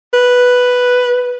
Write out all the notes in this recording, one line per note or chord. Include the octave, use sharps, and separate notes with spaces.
B4